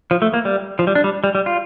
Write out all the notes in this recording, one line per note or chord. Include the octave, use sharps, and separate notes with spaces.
F3
A3
A#3
G3
F3
G3
D4
G3
G3
G3
F4